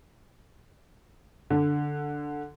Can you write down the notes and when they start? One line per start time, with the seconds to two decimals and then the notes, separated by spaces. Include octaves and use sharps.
1.50 D3